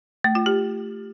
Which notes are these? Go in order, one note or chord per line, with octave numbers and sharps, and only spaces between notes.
A3
F4
G4